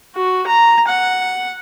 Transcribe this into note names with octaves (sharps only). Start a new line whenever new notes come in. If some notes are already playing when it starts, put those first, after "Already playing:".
F#4
A#5
F#5